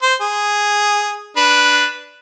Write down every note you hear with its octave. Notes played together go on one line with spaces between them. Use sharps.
C5
G#4
D4 B4